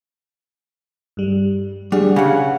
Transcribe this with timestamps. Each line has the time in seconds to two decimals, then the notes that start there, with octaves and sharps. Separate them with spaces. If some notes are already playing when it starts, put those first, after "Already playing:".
1.17 G2 G3
1.92 G3 D4 G#4 F#5
2.16 C#3 F#5 G#5